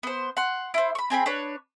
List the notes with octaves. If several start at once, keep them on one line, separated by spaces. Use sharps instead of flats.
B3 C5
F#5 C6
E4 C5
B5 C#6
C4 G#4 G5 B5
D4 B4 C#5